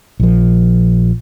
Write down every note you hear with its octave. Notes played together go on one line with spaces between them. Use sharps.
A#1 F3